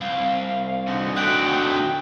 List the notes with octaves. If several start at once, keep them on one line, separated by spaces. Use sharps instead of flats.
C2 F5
D3 D#4 F#4
F#3 A3 G5 F#6 G6 D7
G5